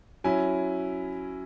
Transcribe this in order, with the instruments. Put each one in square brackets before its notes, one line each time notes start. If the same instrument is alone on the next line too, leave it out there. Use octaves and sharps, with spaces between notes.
[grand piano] F#3 C#4 E4 G#5